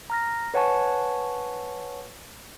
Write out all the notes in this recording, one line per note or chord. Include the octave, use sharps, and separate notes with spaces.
A#5 F6 A#6
B4 C#5 F#5 G#5 A5 C#6